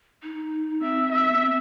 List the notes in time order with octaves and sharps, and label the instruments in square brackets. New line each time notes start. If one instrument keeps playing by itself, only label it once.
[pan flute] D#4
[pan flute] C4 [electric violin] E5
[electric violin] E5
[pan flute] B3
C4